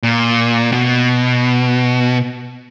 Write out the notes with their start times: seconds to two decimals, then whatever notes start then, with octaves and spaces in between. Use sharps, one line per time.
0.03 A#2
0.72 B2